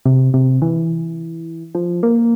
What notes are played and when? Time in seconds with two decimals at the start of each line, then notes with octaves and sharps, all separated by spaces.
0.05 C3
0.34 C3
0.62 E3
1.75 F3
2.03 A#3